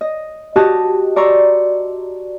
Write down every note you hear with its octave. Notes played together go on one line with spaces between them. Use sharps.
D#5
F#4 G4 D#5 A5 F#6
D5 A#5 C6 C#6 E6